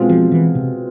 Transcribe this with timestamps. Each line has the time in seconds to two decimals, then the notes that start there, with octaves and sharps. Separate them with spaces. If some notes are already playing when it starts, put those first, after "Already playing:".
Already playing: B2 G#3 C4 F4
0.09 F3
0.32 E3
0.55 C3